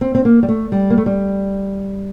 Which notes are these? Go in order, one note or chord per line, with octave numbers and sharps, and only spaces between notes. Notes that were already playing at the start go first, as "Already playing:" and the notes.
C4
C4
A#3
G3
A3
G3
A#3
A3
G3